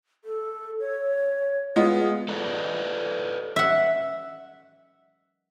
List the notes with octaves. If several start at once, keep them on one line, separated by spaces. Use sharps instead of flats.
A4
C#5
G#3 B3 F4 G#4
A4 B4 D5 D#5
E5 F#5